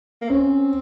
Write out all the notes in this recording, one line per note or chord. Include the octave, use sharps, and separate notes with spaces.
A#3
C4 C#4